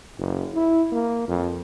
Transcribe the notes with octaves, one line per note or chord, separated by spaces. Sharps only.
F#1
E4
A#3
F2